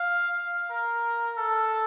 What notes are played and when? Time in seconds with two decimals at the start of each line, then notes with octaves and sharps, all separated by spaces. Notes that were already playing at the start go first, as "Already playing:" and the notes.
Already playing: F5
0.71 A#4
1.38 A4